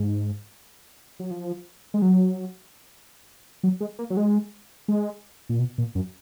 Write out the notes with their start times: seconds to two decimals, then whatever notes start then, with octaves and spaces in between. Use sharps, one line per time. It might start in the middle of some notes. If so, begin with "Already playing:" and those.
Already playing: G#2
1.20 F#3
1.31 F3
1.94 G#3
2.02 F#3
3.63 F#3
3.81 G#3
3.99 A#3
4.10 F#3
4.17 G#3
4.88 G#3
5.49 A#2
5.59 B2
5.78 A#2
5.95 F#2